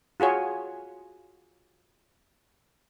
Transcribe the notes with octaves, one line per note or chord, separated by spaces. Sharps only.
F4 F#4 G#4 C#5